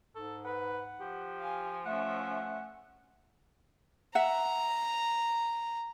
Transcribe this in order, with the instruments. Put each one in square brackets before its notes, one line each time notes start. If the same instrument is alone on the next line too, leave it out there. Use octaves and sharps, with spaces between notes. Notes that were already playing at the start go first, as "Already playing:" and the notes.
[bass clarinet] G#2 [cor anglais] A4
[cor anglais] B4 [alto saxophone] F#5
[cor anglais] F3 [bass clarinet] G4
[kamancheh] F5 G#5
[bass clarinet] A3 [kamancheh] C#4 E5 [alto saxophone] F#5
[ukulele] E5 F#5 [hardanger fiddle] A#5